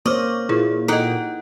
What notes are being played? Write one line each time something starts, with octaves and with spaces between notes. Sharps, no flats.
A#3 C5 C#5 D#5 C#6 D6 F6
A#2 E4 G#4
D#4 A4 D#5 F#5 G5